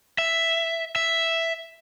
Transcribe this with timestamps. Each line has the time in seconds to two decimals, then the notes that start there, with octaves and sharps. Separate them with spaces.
0.18 E5
0.96 E5